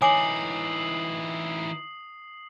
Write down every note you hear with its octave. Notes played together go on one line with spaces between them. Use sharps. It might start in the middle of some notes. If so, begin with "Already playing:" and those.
E3 D#4 C#5 G#5 D6 D#6 C7 F#7